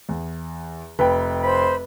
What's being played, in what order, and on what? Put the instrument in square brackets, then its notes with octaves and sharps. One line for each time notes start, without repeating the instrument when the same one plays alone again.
[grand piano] E2
[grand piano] F1 G5 [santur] B4
[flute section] C5 B5